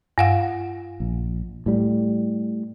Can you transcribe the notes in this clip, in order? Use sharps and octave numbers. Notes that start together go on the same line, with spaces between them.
G2 F5 F#5
A#1
A2 G3